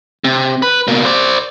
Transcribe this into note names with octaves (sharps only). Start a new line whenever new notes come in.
C3
B4
B2 A#3
C5 D5